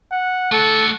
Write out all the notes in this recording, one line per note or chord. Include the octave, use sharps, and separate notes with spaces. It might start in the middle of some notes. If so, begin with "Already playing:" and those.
F#5
A3 A4 F#5